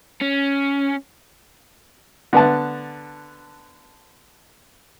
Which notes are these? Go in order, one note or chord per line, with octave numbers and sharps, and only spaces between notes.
C#4
D3 B3 A5